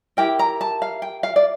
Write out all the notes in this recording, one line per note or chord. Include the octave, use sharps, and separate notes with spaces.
E4 G4 A#4 G5
A#5
A5
F5
G5
F5
D5